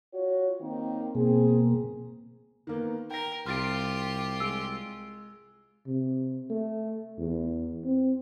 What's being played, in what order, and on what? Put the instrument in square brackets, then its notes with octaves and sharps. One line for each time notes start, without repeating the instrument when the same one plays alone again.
[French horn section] F4 F#4 C#5
D#3 A#3 C4
[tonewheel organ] B2 A#3 [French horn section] C4 G#4
[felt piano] D#3 A#3 B3
[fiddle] A#4 [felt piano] G5 A#6
[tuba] C2 [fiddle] F4 G4 [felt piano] C6 A6 [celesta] F6 D7
[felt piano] G#3 [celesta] E6 D7
[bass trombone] C3
A3
E2
C4